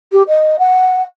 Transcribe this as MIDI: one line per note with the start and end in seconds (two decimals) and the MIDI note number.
0.12 0.23 67
0.28 0.56 75
0.59 1.03 78